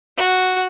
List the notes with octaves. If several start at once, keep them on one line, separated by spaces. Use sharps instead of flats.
F#4